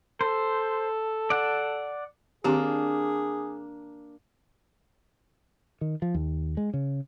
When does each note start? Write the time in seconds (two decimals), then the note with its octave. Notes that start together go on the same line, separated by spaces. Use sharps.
0.21 A4 C5
1.30 D5 F#5
2.44 D#3 A#3 C4 D4 G4 G#4
5.81 D#3
6.02 F3
6.14 D#2
6.57 G#3
6.74 C#3